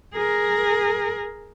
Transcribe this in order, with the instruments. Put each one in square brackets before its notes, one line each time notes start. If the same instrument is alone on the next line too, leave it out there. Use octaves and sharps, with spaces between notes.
[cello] G#4 A#4